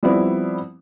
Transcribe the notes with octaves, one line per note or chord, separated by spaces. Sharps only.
F3 G3 B3 C4 E4